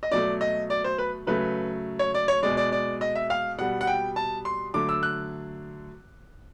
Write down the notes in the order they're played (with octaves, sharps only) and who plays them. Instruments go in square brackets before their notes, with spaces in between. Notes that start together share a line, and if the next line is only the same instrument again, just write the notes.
[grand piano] D#5
B2 F#3 A3 D5
D#5
D5
C5
B4
C#3 F#3 A3 B4
C#5
D5
C#5
B2 G#3 D5
D5
D5
D#5
E5
F5
B2 G3 F#5
F#5
G5
A5
C6
D3 F#3 A3 D6
E6
F#6